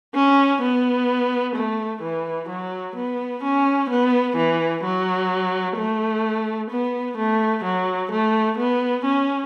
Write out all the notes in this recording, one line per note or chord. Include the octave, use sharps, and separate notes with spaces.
C#4
B3
A3
E3
F#3
B3
C#4
B3
E3
F#3
A3
B3
A3
F#3
A3
B3
C#4